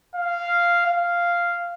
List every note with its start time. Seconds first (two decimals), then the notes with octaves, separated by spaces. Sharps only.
0.15 F5
0.87 F5